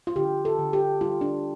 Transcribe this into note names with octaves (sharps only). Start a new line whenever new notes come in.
F4
D3 G4
A4
D3
G4
G3 F4
D4